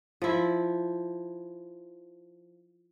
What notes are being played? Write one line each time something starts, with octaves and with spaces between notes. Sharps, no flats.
F3 E4